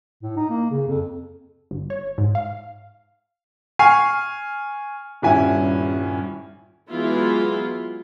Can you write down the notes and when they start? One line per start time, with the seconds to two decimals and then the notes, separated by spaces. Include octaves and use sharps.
0.23 A2
0.36 D#4
0.50 A#3
0.71 C#3
0.88 F2
1.71 G1
1.90 C#5
2.18 G#2
2.35 F5
3.79 G#5 C#6 F6 C7
5.22 D#1 G2 C#4 E4 G#5
6.89 E3 F#3 G#3 B3 E4 F4